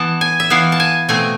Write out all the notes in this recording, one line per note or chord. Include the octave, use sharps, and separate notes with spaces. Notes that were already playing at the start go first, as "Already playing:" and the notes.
Already playing: E3 B3 A5
G#5
E5
E3 B3 F5
A5
G#5
B2 A3 C4 G#5